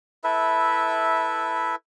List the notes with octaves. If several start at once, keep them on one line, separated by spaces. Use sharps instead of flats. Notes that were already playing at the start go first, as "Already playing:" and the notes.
E4 A4 B4 E5